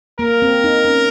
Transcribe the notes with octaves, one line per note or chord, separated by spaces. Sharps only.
A#3 A#4
C4
D#4
C#4